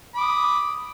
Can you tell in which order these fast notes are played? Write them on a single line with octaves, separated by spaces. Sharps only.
B5 D6 D#6